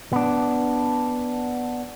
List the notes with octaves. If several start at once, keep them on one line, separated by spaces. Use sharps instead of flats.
B3 D4